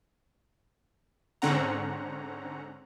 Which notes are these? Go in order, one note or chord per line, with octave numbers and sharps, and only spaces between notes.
G#2 D3 C4 C#4 F#5 A#5